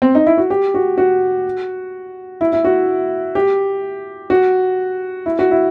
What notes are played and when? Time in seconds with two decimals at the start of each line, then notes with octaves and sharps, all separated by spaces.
0.02 C4
0.15 D#4
0.26 E4
0.37 F#4
0.50 G4
0.74 F#4
0.98 F#4
2.41 E4
2.53 E4
2.65 F#4
3.35 G4
4.30 F#4
5.26 E4
5.39 F#4
5.51 E4